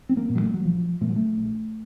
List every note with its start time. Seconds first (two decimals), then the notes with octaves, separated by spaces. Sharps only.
0.09 C4
0.17 A#3
0.29 A#2
0.35 F#3
0.42 A3
0.54 F#3
0.65 A#1 F3
1.01 A#2 A3
1.09 F#3
1.16 A3
1.37 A#1